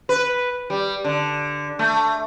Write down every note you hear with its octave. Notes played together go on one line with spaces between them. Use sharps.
B4
G3
D3
A3